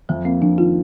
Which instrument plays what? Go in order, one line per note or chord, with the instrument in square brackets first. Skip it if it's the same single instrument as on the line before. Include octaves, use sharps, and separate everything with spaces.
[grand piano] F2 [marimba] F3
[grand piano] A#3 [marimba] C4
[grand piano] F2 [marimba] D4
[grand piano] D#3 [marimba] F4